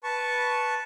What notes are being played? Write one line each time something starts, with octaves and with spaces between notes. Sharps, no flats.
B4 A5 C#6